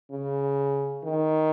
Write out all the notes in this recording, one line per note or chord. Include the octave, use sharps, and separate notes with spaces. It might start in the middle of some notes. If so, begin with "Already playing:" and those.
C#3
D#3